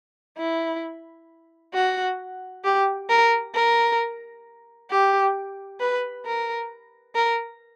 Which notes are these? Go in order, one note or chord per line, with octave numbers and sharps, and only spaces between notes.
E4
F#4
G4
A#4
A#4
G4
B4
A#4
A#4